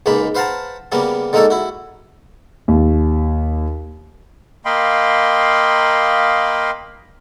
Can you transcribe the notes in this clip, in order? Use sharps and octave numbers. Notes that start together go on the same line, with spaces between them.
C#2 G#2 G#3 A#3 B5
B4 C5 F5 F#5 A5 A#5
C#3 G3 A#3 B3 C#4
D3 G#3 A#3 D#4 A4 C#5
E4 F#4
D#2
A#3 D#5 F5 G5 B5 C6